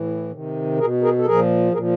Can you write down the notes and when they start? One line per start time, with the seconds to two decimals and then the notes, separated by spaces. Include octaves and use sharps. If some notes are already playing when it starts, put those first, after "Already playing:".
Already playing: A2 E3
0.32 C3 D#3
0.78 B2 G#4 A#4
1.02 G#4 A#4
1.18 A4
1.26 A#2 F3 G#4 A#4
1.73 A#2 G#4 A#4
1.77 F3